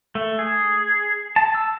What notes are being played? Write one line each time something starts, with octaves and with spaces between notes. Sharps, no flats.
A3
G#4
A5
E6